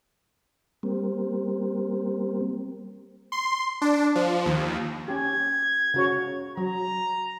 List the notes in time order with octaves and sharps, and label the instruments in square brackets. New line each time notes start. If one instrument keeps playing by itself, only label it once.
[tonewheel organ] G3 A#3 C4
[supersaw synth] C6
D4
F3
D#2
[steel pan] C#4 G4 [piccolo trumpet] G#6
[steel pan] C#3 F#4 C#5
[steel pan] F#3 [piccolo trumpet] A#5